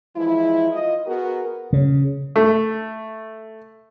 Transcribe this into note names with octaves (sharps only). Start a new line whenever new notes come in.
E3 F3 G#3 E4
F4 D#5
B3 F#4 G#4 A#4
C#3
A3